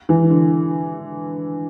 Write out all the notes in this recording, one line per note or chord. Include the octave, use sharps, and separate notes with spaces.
E3
D3